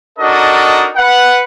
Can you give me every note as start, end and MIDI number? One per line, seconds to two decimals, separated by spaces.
0.19 0.90 62
0.19 0.90 63
0.19 0.90 66
0.19 0.90 69
0.19 0.90 70
0.19 0.90 75
0.96 1.43 71
0.96 1.43 78